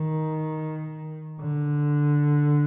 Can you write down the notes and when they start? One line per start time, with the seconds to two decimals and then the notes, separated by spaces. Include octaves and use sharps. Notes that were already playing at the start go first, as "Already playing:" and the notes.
Already playing: D#3
1.40 D3